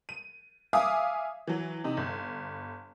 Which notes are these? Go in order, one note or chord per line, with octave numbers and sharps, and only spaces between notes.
D#7
E5 F5 G#5 D6 D#6
E3 F#3
C3 D#4
G1